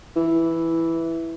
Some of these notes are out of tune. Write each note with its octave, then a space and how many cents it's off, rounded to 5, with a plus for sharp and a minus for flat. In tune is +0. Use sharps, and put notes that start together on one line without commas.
E3 +0